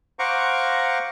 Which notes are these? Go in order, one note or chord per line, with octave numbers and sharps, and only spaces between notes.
C5 F5 F#5 A#5 C#6 D6